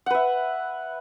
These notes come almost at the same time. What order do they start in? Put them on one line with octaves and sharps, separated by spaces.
F#5 B4 E5